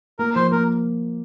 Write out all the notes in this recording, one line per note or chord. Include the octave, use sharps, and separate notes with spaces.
A#3 A#4
F3 C5
A#3 A#4